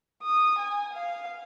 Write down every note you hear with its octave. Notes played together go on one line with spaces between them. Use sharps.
D#6
G#5
F5